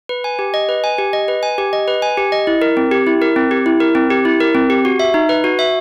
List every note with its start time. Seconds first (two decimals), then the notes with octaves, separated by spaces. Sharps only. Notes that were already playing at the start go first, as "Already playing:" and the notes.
0.09 B4
0.24 G#5
0.39 G4
0.54 D#5
0.69 B4
0.84 G#5
0.98 G4
1.13 D#5
1.28 B4
1.43 G#5
1.58 G4
1.73 D#5
1.88 B4
2.02 G#5
2.18 G4
2.32 D#5
2.47 E4
2.62 A#4
2.77 C4
2.91 G4
3.07 E4
3.22 A#4
3.36 C4
3.51 G4
3.66 E4
3.80 A#4
3.95 C4
4.10 G4
4.25 E4
4.40 A#4
4.55 C4
4.70 G4
4.85 F#4
4.99 E5
5.14 D#4
5.29 B4
5.44 F#4
5.59 E5